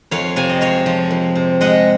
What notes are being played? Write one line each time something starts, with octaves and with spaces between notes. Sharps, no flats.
F2 C#5 F5
C3 F5 G#5
D#5
G#3 C#5 F5
F3
F2
C3
G#3 D#5 F#5